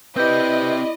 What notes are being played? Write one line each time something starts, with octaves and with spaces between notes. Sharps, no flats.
C4 E4 G4 B4 D5 D#5 G6